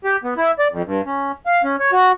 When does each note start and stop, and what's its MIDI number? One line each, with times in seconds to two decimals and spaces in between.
0.04 0.16 67
0.24 0.34 59
0.37 0.51 64
0.59 0.68 74
0.72 0.82 41
0.86 1.01 43
1.06 1.32 61
1.46 1.62 77
1.64 1.76 61
1.80 1.91 73
1.92 2.12 66